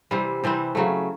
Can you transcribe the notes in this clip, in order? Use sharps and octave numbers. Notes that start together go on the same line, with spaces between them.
C3 E3 G3 C4
C3 E3 G3 C4
C#3 F#3 A3